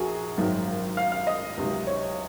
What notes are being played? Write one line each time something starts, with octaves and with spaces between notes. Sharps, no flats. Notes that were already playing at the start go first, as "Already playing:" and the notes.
Already playing: A#1 F#4 G#4 A#4
G#1 F#2 D#3 F#3
F5
F5
D#5
C#2 C3 D#3 F#3
C#5